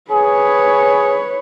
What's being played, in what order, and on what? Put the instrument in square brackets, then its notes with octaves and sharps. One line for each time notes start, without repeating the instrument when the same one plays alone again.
[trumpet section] G#4 [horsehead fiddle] B4 C#5